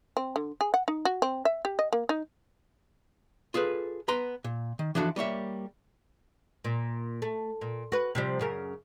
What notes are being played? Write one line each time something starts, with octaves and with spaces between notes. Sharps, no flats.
C4
D3
G#4
F#5
D#4
F#4
C4
E5
G4
D#5
A#3
D#4
F4 G#4 A4 B4
B3 B4 A#5 C6
A#2
D#3
E3 F3 D4 F#4 A4
G3 A#3 C#5 E5
A#2
A3
A#2
F#4 B4
C3 F3 G3
F#2 C#3 A#4